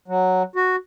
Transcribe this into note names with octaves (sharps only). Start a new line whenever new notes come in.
F#3
F#4